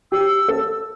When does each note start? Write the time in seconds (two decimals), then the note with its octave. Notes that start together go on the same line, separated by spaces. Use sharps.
0.12 G4 E6
0.48 A4